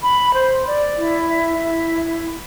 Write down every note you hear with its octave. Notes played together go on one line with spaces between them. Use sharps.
B5
C5
D5
E4
E5
E4